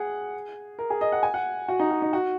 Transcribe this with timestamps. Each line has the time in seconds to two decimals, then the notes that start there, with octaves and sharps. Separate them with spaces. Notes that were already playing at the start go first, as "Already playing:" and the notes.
Already playing: G#4 F#5
0.79 A#4
0.90 G#4
1.01 D#5
1.12 F#5
1.23 G#5
1.34 F#5
1.69 F#4
1.80 D#4
1.91 F#4
2.02 D#4
2.13 F#4